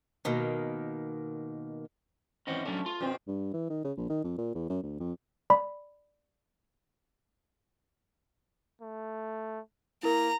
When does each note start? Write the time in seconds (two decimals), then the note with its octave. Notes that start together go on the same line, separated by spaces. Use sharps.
0.25 B2 D#3 A#3
2.47 G#2 E3 C4 C#4 D#5 F#5
2.65 F#3 A3 C#4 D4
2.86 F4
3.01 F2 B2 C4
3.27 G2
3.53 E3
3.70 D#3
3.84 C#3
3.97 A#1
4.09 D#3
4.24 F2
4.38 A#2
4.55 E2
4.69 F#2
4.83 D2
5.00 F2
5.50 D5 B5
8.81 A3
10.03 A#3 E4 A#4 A#5